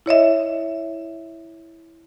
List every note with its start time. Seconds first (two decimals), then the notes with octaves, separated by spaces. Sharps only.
0.06 E4 C#5 D#5 E5